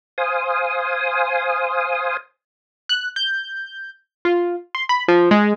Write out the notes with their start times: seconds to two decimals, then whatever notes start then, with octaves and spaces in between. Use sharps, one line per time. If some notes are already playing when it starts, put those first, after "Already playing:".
0.18 C5 F5 G#5 D#6
2.89 F#6
3.16 G6
4.25 F4
4.75 C6
4.89 B5
5.08 F3
5.31 G#3